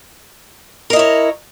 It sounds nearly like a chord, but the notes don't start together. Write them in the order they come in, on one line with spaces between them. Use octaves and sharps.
A#4 D#5 E4 C#5